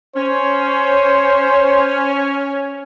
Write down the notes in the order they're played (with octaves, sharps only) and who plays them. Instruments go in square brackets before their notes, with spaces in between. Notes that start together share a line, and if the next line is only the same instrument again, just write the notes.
[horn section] C#4 [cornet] C5